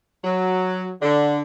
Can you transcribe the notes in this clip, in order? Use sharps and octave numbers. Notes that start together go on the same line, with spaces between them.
F#3
D3